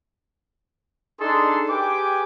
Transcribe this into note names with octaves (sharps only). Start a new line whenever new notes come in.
D4 D#4 G#4 A4 C6
G4 G#4 B4 G5 G#5 D6